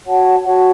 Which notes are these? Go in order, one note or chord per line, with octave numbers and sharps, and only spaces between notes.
F#4 C#5 F#5 A5
F#4 C#5 F#5 A5